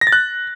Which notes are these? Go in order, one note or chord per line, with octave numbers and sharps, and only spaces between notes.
A#6
A6
F#6